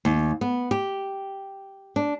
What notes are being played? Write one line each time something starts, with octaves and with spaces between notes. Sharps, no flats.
D#2
B3
G4
D4